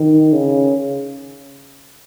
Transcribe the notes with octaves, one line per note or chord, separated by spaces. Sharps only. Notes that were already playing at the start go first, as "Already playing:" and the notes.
Already playing: D#3
C#3